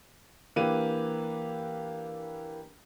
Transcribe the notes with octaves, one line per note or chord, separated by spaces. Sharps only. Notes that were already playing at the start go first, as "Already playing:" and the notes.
E3 A#3 D4 G4 B4 D#7